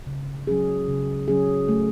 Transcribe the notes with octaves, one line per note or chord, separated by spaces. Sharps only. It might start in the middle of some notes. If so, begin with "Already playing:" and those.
C#3
F#3 C#4 G#4
C#3
F#3 C#4 G#4
A3